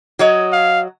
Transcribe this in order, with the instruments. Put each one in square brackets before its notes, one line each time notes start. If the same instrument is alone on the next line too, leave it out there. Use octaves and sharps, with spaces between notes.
[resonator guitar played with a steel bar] F#3 C#5 D#5
[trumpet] F5